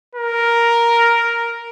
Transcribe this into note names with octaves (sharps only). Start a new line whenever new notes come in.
A#4